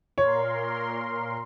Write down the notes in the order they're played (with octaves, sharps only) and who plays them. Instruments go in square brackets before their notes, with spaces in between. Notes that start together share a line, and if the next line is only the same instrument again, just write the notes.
[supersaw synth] A#2 A#4 C6 [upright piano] C#5